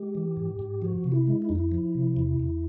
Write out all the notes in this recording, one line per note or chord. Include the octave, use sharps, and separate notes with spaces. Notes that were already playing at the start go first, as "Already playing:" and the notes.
Already playing: G#3 G4
E3
G#2
G#2
F3 F#4
C3
E4
G#3
E4
F2 D#4
E4
F3
C3
E2
E2